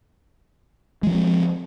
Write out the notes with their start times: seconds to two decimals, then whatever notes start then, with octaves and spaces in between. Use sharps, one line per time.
1.03 G#3
1.07 F3
1.10 C#4
1.14 C4